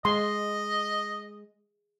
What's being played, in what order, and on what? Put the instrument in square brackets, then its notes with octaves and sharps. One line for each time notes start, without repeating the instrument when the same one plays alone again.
[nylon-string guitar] G#3 [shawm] D#5 [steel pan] C6